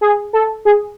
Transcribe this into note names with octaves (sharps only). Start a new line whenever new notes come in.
G#4
A4
G#4